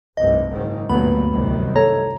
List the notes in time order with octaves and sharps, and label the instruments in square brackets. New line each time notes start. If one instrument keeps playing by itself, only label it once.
[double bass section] F1 C2 G2 [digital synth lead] D#5
[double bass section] F#1 G#2 D#3
[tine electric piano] D2 [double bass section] G2 A#2 F#3 [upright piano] B3 [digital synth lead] B5
[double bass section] C2 F#2 D#3
[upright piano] A3 A4 [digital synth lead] C#5 [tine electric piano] A#5